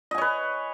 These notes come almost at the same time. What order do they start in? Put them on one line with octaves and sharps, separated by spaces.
D#5 G#5 C#5 B4